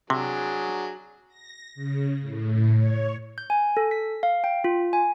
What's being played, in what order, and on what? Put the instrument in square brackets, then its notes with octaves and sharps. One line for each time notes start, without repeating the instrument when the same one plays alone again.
[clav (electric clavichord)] C3 [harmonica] F#3 D4 [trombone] G#4
[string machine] A#6
C#3
A2
C#5
[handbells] G6
G#5
A4
B6
F5
G5
F4
G#5